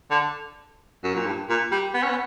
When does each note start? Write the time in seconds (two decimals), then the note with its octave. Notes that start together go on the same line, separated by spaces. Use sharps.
0.11 D3
1.04 F#2
1.15 A#2
1.26 G2
1.49 A#2
1.72 G3
1.94 B3
2.03 C#4
2.10 B3